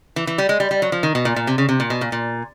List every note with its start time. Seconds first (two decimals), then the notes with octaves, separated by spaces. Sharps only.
0.16 E3
0.27 E3
0.38 G3
0.49 G#3
0.60 G3
0.71 G3
0.82 F#3
0.92 F3
1.03 D#3
1.15 B2
1.25 A#2
1.36 A#2
1.47 C3
1.58 C#3
1.69 C3
1.80 A#2
1.90 B2
2.01 A#2
2.12 A#2